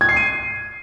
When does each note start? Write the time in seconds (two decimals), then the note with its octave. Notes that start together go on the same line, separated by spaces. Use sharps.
0.01 G#6
0.09 C7
0.17 D#7